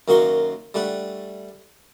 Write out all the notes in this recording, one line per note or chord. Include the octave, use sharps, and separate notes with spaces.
F#2 D#3 A#3 F#4 C6 C#6
G3 A3 D4 F#5